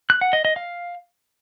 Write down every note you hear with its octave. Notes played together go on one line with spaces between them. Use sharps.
F#6
F#5
D#5
D#5
F5